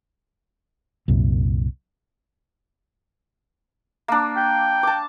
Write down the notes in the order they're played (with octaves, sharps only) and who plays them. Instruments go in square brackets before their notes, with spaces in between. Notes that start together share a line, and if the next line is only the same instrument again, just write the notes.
[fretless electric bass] C2 F#2 A#2
[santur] A#3 D4
[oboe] G5
[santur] A5 D6